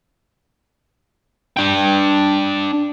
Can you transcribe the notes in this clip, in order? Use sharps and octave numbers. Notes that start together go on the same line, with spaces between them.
D4 G5